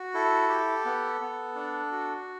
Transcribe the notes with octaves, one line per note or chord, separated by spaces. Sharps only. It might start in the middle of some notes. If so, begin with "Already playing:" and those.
Already playing: F#4
E4 A4
G4
B3
B3
D4
F#4